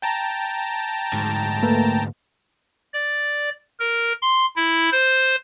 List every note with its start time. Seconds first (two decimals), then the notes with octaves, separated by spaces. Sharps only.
0.02 G5 A5 A#5
1.13 D2 G#2
1.63 A3 A#3 B4
2.93 D5
3.80 A#4
4.22 C6
4.56 E4
4.92 C5